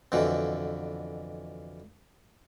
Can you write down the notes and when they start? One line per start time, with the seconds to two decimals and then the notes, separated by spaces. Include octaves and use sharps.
0.12 F2 B2 D3 E3